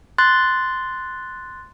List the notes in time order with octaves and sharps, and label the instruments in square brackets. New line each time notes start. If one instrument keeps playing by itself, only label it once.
[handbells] C6 F#6 A6